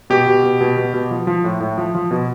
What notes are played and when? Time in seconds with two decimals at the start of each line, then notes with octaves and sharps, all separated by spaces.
0.10 B2 G4
0.27 B2
0.44 B2
0.61 B2
0.77 B2
0.94 B2
1.11 F3
1.27 F3
1.44 A2
1.60 A2
1.78 F3
1.95 F3
2.11 B2